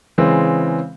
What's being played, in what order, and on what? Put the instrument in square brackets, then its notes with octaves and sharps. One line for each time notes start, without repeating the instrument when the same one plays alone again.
[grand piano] C#3 E3 G#3 C4